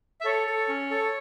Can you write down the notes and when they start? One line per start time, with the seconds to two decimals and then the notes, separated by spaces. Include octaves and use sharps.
0.21 E5
0.25 A4 C#5
0.47 A4
0.69 C#4
0.91 A4